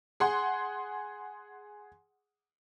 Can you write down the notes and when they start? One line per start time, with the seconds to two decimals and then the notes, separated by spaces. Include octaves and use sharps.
0.20 G#4 F#5 C6